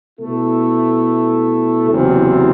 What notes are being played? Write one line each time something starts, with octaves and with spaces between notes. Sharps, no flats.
B2 A3 E4 A4
F#1 E2 C3 F#3 C4